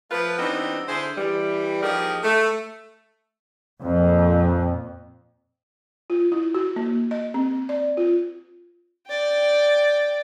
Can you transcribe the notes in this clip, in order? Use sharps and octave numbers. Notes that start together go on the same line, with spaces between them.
F3 A3 F4 B4
E3 G3 B3 C4 D4 D#4
D3 E4 G#4 C5
E3 G3
F3 A#3 D#4 G4 G#4 A#4
A3
F2 A#2
F4
E4
F#4
A#3
D#5
C4
D5
F4
D5 G5